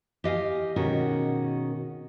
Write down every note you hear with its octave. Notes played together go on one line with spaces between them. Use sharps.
G4 D#5 F5 G#5
B2 D#3 C#4 F#4 G#4 A#4